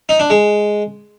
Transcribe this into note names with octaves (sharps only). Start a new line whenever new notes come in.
D#4
D4
G#3